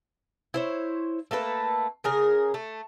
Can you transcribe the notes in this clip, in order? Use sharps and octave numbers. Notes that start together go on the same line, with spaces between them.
E4 C5 C#5
A3 A#3 A4 B4
C#3 G#4 A#4
A3